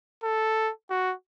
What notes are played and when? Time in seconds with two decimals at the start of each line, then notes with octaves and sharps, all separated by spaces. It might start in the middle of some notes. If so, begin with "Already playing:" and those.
0.24 A4
0.90 F#4